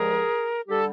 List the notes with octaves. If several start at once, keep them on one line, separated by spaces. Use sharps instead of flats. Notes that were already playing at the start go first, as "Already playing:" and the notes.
Already playing: G2 D3 F3 G#3 G#4 A#4
D3 G3 G4 A4